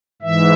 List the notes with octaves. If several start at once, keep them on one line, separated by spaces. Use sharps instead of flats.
G#2 E3 E5